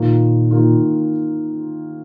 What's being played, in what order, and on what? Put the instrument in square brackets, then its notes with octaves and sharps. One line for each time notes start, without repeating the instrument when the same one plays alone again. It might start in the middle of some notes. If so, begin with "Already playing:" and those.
Already playing: [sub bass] A#2 [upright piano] D#3 A#3 F4
[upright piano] D#3 A#3 F4